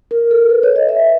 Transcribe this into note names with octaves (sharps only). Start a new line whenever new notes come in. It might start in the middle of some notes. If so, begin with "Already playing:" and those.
A#4
A4
B4
C#5
D#5
E5